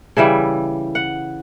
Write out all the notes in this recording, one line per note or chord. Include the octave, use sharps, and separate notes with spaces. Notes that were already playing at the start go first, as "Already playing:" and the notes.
C#3 E3 G3 E5
F#5